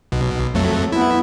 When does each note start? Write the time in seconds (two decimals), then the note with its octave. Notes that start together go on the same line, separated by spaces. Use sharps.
0.12 B1 B2
0.54 F2 F#3 A3
0.92 B3 E4